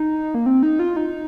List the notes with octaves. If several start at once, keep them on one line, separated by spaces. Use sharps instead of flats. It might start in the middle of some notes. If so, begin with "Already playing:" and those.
Already playing: D#4
A#3
C4
D#4
F4
D#4